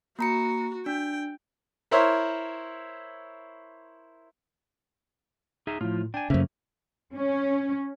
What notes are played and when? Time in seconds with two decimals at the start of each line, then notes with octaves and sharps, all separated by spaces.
0.19 A#3 F#4 A#5 C#7
0.86 D4 G5
1.91 E4 A#4 C5 C#5 E5
5.67 D#4 G#4 E5
5.81 A2 F3 F4
6.14 D4 G5 G#5
6.30 F#2 C#3 A3 A#3 C#4 C5 E5
7.14 C#4